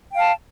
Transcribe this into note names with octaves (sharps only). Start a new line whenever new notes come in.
F5 G5 A5